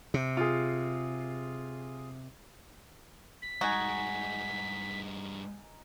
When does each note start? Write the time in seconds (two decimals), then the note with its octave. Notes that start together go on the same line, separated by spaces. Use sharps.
0.14 C3
0.37 F4 G#4
3.42 B6
3.61 G2 G#3 D#4 F#4 G#5